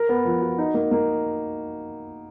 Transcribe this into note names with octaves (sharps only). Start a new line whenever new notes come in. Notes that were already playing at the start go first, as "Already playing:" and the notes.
Already playing: A#4
B3
F3
F#4
D#4
A#3
A#3